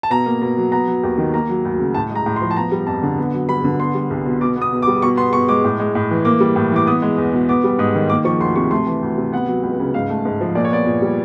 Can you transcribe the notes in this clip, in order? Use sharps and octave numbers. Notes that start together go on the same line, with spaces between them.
A5
B2 A#5
A#3
B2
F#3
B3 A#5
F#3
D#2
D#3
A#3 A#5
F#3
D2
C#3
A2 A5
G#3
A#5
A2
C6
F3
A5
B3 A#5
G3
F2 A5
D3
B3
F#3
G2 B5
D3
B3 C6
G3
C2
B2
B2 D6
B3
D#6
B2
D6
G3
B2 C#6
B3 C6
B2 C#6
G#3 D6
A2
G#3
A2
E3
A#3 D6
G3
A2
E3 D6
B3 D#6
G#3
E2
B2
B3 D6
G3
G#2 D#6
D#3
A#3 D6
F3 C#6
D2 C6
C3 C#6
A3 C6
E3
D2
C3
B3 F#5
F#3
C#2
C#3
G#2 F5
A3
G#2
F3
A#2 D5
C#5
B3 D5
A#2
G3